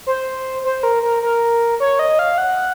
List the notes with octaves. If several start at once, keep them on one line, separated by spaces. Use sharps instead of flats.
C5
C5
A#4
A#4
A#4
C#5
D#5
F5
F#5